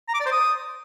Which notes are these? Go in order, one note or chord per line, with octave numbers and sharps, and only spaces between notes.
A#5
D6
D5
C5
D#6